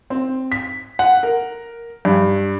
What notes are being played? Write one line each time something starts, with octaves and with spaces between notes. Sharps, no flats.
C4
B6
F#5
A#4
G2